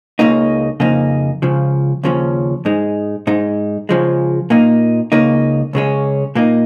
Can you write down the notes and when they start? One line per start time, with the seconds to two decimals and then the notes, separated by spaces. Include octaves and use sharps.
0.19 C#2 C#3 A#3 D#4
0.80 F2 C#3 A#3 D#4
1.42 C#2 C#3 F3
2.04 D#2 C#3 F3 C#4
2.65 G#2 G#3 D#4
3.27 G#2 G#3 D#4
3.89 C#3 F3 G#3
4.50 A#2 A#3 D#4
5.12 C#2 C#3 A#3 D#4
5.73 C#2 C#3 G#3 C#4
6.35 A#2 A#3 D#4